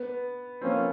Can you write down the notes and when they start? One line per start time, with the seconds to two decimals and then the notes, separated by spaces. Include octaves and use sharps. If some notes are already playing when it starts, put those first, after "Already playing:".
Already playing: B3
0.61 F3 A#3 C4 C#4